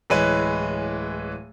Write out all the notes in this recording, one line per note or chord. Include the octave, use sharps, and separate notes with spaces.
D1 E3 G#3 B4 C#5 D#7